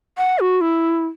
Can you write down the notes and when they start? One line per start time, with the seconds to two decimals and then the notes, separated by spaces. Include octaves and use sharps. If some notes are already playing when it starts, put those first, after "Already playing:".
0.18 F#5
0.39 F#4
0.61 E4